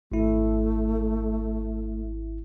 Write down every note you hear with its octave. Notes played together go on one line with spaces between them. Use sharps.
G#1 A3 E4